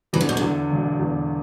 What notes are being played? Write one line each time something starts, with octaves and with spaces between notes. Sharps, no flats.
E2 E3
D3
B2
E2 D3
E1
E2